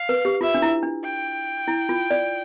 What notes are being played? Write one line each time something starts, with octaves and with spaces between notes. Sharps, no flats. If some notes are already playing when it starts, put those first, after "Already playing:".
Already playing: F5
B4
G4
F4 E5
D4
E4
D4
G5
E4
F4
D5